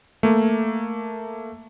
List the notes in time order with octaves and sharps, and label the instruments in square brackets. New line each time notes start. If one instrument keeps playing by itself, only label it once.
[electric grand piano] A3 A#3